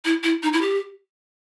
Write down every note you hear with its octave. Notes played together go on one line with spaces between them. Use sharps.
E4
E4
D#4
E4
G4